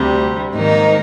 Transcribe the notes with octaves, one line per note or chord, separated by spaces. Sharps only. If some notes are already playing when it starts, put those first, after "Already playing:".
Already playing: D2 C3 G3
G#2 D#3 A#3 D#4 A#4